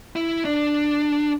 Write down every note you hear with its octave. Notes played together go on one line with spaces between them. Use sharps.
E4
D4